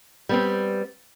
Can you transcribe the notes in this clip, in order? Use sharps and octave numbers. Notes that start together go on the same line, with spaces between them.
G3 B3 C4